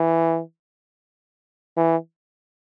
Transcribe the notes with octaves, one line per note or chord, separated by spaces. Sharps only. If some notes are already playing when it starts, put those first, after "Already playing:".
Already playing: E3
E3